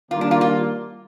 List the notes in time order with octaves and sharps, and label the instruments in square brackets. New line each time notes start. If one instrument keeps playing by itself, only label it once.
[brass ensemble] D#3 G3 A#3 [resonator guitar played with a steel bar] F4
[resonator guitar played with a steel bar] D4
F4
F4